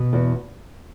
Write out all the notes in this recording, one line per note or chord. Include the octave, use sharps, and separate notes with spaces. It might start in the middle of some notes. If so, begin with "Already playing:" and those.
Already playing: B2
E2